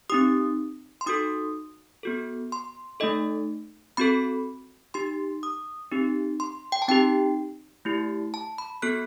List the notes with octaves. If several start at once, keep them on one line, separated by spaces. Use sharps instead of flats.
C4 D#4 G4 D#6
C6
D#4 F#4 A4 D#6
B3 F#4 A4
C6
A3 D#4 A4 D#5
C4 F#4 A4 B5
D#4 G4 C6
D#6
C4 D#4 G4
C6
G5
A5
C4 D#4 G4 G5
A3 E4 G4
A5
B5
B3 F#4 A4 F#6